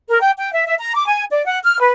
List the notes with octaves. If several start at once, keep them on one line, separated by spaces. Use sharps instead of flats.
A#4
G5
G5
E5
E5
A#5
D6
G#5
D5
F#5
F6
B4